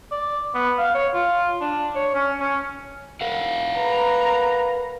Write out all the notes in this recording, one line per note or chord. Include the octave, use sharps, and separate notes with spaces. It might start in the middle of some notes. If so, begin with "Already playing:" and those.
D5
B3
F5
C#5
F4
D4
C#5
C#4
C#4
A#4 F5 F#5
B4 A#5